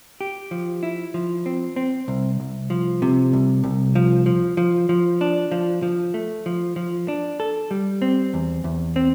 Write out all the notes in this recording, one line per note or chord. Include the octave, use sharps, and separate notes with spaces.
G4
F3
E4
F3
C4
C4
C2
C2
F3
C3
C2
C2
F3
F3
F3
F3
D4
F3
F3
A3
F3
F3
D4
A4
G3
C4
E2
E2
C4